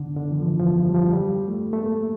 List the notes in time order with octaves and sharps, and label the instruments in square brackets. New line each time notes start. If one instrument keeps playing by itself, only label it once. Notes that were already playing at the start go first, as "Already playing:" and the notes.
Already playing: [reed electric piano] D3
D3
E3
F3
F3
F3
G3
F3
G3
A3
A3
A#3